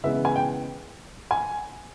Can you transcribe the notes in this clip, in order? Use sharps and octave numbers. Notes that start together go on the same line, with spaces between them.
C#3 E3 G#3 B3 E5
G#5
G5
G#5